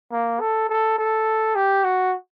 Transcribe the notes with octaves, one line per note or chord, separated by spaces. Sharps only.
A#3
A4
A4
A4
G4
F#4